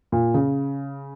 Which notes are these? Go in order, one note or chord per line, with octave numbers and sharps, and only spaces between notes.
A#2
C#3